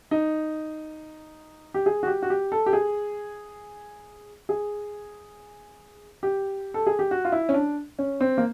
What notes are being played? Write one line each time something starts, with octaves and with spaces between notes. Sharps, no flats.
D#4
G4
G#4
F#4
G4
F#4
G4
A4
G4
G#4
G#4
G4
A4
G#4
G4
F#4
F4
E4
C#4
D4
C#4
C4
A#3